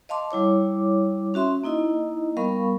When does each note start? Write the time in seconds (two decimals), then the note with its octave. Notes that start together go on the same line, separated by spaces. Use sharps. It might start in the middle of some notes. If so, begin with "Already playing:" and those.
0.09 D#5 F5 A5 C6 D6
0.31 G3 E4 C#5 D6
1.34 C#4 F#4 E5 C6
1.64 A#3 D#4 E4 D#5
2.37 G3 B3 A#4 F5 B5 C#6